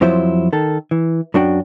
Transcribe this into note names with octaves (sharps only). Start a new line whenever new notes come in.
F2 F3 F#3 E4 C5
D#3 A4
E3
F#2 D4 F#4 G5